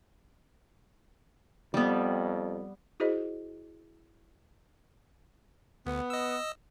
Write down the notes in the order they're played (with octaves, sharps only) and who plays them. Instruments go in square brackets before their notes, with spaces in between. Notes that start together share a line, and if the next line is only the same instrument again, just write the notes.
[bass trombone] F2 [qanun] G3 B3
[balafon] E4 F#4 G#4 C5 D#5
[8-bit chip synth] D2 [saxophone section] B3
[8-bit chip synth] D#5 E6